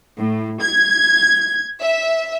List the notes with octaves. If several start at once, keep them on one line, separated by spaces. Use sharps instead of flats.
A2
G#6
E5